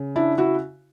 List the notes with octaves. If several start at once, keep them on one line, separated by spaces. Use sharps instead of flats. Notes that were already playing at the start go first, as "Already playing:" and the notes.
Already playing: C#3
D4 E4
E4 F#4